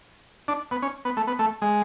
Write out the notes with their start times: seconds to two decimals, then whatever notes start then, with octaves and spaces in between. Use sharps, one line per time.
0.48 D4
0.71 B3
0.82 C#4
1.05 B3
1.17 A3
1.27 B3
1.39 A3
1.62 G#3